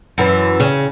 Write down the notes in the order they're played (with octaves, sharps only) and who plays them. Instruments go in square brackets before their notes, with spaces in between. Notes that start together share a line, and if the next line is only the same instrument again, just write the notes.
[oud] F#2 E3
C#3